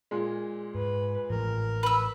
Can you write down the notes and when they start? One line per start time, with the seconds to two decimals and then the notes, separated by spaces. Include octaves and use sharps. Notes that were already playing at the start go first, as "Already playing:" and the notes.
0.11 A#2 G#3
0.75 G#2 B4
1.30 A1 A2 F3 A#4
1.83 B4 E6